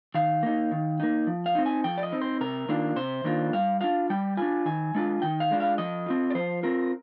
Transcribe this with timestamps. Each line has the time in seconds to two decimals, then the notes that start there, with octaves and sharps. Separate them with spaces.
0.15 D#3 F5
0.43 A#3 D#4
0.72 D#3
1.00 A#3 D#4
1.27 F3
1.46 F5
1.55 C4 D#4
1.66 G#5
1.84 F3 G5
1.98 D5
2.03 D#5
2.12 C4 D#4
2.22 C5
2.41 C3 A#4
2.69 D#3 A#3 D4 F4
2.96 C3 C5
3.24 D#3 A#3 D4 F4
3.53 G3 F5
3.81 D4 F4 F5
4.10 G3 G5
4.37 D4 F4 G#5
4.66 D#3 G#5
4.95 G#3 D4 F4
5.22 D#3 G5
5.40 F5
5.51 G#3 D4 F4
5.60 F5
5.78 F3 D#5
6.06 C4 F4
6.30 D5
6.35 F3 C5
6.63 C4 F4 A#4